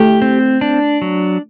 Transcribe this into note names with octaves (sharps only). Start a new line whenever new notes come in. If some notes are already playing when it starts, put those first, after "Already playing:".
Already playing: A3 G4
C4
D4
F#3